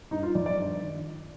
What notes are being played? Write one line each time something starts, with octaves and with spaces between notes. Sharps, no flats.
G2 D#4
F4
F3 D5
D5
G2
D#3